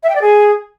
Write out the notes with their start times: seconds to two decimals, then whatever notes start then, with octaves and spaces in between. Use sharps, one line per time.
0.03 E5
0.09 G5
0.15 D5
0.21 G#4